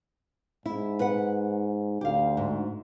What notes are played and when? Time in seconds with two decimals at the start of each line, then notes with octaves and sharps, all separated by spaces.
0.66 G#2 E4
1.00 B4 F#5
2.01 D2 G4 F5
2.37 G#2